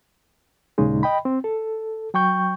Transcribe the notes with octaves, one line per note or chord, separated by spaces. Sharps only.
D#2 A#2 C#3 G#3 D#4
D#5 G5 B5
C4
A4
F#3 G5 C#6 G6